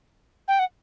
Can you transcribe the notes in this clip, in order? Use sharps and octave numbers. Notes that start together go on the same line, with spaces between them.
G5
F#5